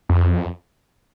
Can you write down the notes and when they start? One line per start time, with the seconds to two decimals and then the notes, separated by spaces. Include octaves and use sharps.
0.09 F2